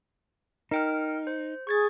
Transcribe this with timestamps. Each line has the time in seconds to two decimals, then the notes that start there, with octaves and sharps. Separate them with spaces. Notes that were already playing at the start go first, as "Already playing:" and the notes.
0.71 D#4 A#4 G5 F6
1.27 C5
1.67 G#4 C#6 G#6 A6